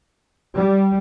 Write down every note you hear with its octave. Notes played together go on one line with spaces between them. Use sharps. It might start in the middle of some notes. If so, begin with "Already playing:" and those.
G3